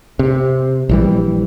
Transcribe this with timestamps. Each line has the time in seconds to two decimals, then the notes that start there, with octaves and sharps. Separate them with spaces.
0.19 C3
0.89 A#1 E3 G3